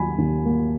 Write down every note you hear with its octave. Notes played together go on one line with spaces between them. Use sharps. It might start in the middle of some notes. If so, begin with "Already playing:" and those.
Already playing: D#2 F#3 G#5 B5
D#2
A#3